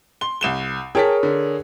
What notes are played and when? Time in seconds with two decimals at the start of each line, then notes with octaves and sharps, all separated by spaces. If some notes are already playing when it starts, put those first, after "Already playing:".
0.21 C6 G7
0.41 C2 E7 G7
0.95 G#4 A#4 C#5 G5 A5 B6
1.23 D3